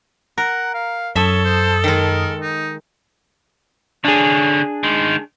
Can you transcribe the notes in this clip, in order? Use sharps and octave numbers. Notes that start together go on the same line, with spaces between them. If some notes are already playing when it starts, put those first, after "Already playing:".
A#4 F#5 A#5
F5
F#2 A4 C#5 E5 A5 D#6
C5
D#3 G#3 A#4
D#4
D3 C#4 D4 G#4
D#3 G#3